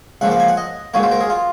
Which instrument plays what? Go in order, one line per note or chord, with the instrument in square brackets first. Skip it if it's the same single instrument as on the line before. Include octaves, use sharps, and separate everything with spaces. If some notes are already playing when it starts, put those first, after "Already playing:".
[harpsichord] C#2 C#3 F3 A#3 F#5
F5
G#5
F#5
D#5
C#2 C#3 F#3 A#3 C#5
C5
A#4
G#4
F4